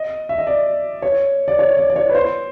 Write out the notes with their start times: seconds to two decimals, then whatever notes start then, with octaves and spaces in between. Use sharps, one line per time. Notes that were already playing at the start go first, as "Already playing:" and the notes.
Already playing: D#5
0.29 E5
0.38 D#5
0.47 D5
1.02 C#5
1.48 D5
1.59 C#5
1.77 D5
1.90 D5
1.96 C#5
2.09 B4
2.15 C5